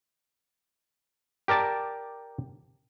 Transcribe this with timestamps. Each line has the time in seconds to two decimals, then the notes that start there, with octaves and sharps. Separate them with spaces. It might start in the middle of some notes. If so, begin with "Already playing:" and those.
1.48 G4 A#4 D5 A5